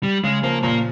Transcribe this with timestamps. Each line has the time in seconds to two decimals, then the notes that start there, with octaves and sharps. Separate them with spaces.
0.03 G3
0.24 C#3 G#3
0.43 F3 A#3
0.63 A#2 A#3